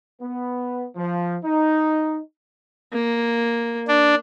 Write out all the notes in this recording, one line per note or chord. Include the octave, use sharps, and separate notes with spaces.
B3
F3
D#4
A#3
D4